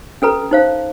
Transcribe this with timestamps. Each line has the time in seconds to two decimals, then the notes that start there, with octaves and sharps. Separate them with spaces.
0.22 C#4 A4 B4 A#5
0.51 D#4 C5 F5